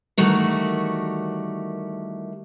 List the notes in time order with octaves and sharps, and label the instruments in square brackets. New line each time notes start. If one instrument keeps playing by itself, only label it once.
[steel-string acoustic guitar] D#3 E3 G3 A3 F#4 A#4